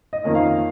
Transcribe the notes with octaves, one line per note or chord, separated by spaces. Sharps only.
D#5
F2 D#3 A#3 C#4
F5